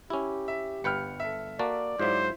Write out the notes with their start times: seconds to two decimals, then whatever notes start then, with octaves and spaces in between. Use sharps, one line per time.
0.10 C#4 E4 G4
0.48 E5
0.84 G1 B4 G5 F6 C#7
1.20 A4 E5
1.59 A#3 F#4 D5 A5
2.00 G#2 F#3 E4 F4 C5